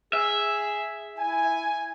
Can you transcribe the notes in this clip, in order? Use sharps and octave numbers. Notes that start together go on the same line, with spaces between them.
G#4 E5
E4 G#5